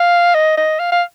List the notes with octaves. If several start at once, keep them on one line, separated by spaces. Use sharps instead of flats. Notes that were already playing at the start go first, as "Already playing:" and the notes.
Already playing: F5
D#5
D#5
F5
F5